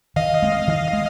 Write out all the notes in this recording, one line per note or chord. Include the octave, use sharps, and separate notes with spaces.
D#3 D#5 F5
G#3 C4
D#3
G#3